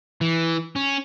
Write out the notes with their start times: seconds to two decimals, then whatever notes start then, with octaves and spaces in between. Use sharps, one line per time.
0.21 E3
0.76 C#4